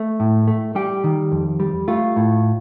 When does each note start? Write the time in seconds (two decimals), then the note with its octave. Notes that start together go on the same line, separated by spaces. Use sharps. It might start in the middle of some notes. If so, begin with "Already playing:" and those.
Already playing: A3
0.20 A2
0.48 A3
0.75 G3 G4
1.04 D#3
1.32 F2
1.60 G3
1.88 A3 F4
2.16 A2